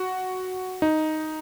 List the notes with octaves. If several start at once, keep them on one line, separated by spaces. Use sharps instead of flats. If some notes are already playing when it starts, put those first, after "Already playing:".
Already playing: F#4
D#4